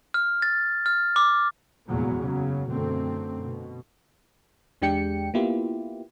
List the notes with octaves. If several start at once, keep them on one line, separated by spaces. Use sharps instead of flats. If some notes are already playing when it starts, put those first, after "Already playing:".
F6
A6
F6
D6
F1 E2 A#2 F#3 G#3 B3
F#1 C#3 F#3
F#2 B2 D3 A3 C4
B2
E2 G#3 D4 G4 G5 C#7
A#3 B3 E4 F4 G4